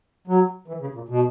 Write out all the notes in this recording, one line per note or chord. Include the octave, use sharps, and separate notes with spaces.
F#3
E3
C#3
A#2
B2